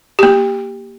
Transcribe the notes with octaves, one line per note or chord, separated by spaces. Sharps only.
A#3 G4